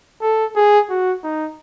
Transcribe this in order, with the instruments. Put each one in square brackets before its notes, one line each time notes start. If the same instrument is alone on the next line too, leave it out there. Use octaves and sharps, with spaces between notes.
[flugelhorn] A4
G#4
F#4
D#4